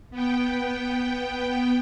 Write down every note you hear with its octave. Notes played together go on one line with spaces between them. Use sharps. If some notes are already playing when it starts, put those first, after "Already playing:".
B3 G5